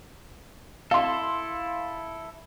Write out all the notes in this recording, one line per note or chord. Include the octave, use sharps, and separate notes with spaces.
E4 A4 F5 C6